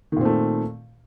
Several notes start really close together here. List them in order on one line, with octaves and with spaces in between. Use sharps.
D#3 A#2 C4 A3